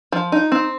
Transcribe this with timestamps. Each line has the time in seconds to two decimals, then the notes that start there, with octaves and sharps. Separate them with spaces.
0.12 F3
0.32 D#4
0.52 C4